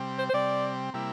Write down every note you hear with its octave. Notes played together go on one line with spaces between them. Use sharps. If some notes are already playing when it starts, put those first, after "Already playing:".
Already playing: C3 G3 C4
C5
C5
C3 G3 C4 D5
C3 G3 A#3 E4